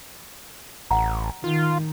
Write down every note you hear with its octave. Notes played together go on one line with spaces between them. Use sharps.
A1 F#5 A#5
D#3 F4